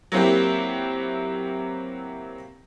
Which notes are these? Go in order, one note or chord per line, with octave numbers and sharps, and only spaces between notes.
F#3 A#3 C4 E4 G4